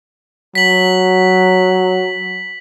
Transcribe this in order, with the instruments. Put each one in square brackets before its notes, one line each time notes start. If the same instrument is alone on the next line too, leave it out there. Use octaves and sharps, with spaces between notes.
[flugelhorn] F#3 [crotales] B6 F#7